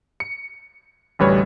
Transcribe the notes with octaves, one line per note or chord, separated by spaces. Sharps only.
C#7
A1 D2 G3 B4 C#5